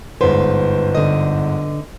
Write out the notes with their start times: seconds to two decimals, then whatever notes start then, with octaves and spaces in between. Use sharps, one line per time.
0.21 G1 G#2 B4 C5
0.95 D3 D#5